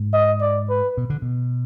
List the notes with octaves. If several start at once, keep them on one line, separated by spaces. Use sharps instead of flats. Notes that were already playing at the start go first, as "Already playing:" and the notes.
Already playing: G#2
D#5
D5
B4
B2
D3
B2